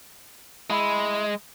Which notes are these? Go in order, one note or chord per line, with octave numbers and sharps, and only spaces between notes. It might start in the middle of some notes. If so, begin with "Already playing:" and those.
G#3 E4